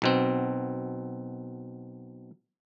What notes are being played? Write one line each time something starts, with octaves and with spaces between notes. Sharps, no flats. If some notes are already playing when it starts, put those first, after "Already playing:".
B1 B2 C4